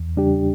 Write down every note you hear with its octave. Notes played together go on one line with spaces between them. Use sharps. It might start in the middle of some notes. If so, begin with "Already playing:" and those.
Already playing: E2
C#3 G3 D4 G4